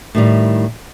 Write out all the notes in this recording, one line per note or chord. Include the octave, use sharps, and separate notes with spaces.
A2 D#3 G3